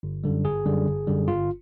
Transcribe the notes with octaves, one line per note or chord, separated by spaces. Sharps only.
G1
F#2 D3 G3
G1 G#4
F#2 D3 G3
G1
F#2 D3 G3
G1 F4